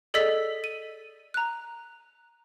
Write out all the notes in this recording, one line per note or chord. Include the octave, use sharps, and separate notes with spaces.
G#4 A4 D5 D#5 E6 B6
D#7
A#5 F#6